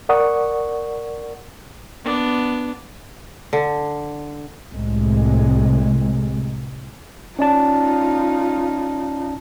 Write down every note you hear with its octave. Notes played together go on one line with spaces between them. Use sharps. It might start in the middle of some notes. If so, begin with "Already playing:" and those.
A#4 D5 F#5 C#6 D#6
B3 D4
D3
C2 A2 C3 G#3
C#4 D#4 F4 D5 A5